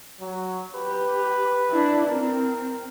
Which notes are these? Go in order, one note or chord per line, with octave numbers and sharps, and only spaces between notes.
F#3
G4 B4
D4 E4
C4 A#4